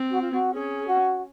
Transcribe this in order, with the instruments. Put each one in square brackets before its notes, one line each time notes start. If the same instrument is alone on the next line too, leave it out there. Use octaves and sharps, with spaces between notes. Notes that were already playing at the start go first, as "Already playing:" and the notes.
Already playing: [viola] C4
[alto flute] F#4
F4
F#4
[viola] C#4 [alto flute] G#4
[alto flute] F#4